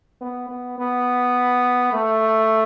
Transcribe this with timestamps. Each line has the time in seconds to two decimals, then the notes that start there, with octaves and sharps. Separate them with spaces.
0.21 B3
0.49 B3
0.78 B3
1.93 A3